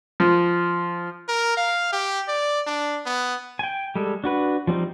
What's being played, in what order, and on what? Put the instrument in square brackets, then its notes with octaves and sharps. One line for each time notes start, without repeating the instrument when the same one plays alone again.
[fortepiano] F3
[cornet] A#4
F5
G4
D5
D4
B3
[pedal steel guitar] G5 G#5
G3 G#3 A4
D4 F#4 B4
F3 G3 C4 D#4